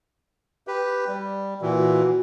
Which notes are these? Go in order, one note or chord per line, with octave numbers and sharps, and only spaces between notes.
G4 B4
G3
A#2 E3 F#4